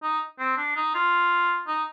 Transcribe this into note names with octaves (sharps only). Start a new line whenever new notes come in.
D#4
C4
D4
D#4
F4
D#4